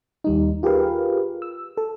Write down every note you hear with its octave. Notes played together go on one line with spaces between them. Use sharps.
D#2 G3 D#4
F4 G4 G#4 A#4 B4 F5
E6
A4